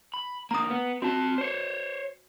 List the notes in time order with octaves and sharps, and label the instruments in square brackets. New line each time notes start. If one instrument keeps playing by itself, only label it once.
[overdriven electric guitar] B5
[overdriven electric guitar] D3 A#3 [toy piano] A#5 D#6
[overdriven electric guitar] B3
[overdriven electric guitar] C4 A5 [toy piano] F#4
[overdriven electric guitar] C5 C#5